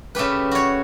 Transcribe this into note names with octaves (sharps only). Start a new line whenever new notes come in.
C#3 A3 G4 B4
F#4 C#5